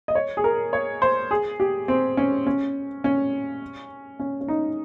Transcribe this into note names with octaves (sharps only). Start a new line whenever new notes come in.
D#5
C#5
G#4
A#4
C#5
C5
G#4
G4
C4
C#4
C#4
C#4
C#4
C#4
D#4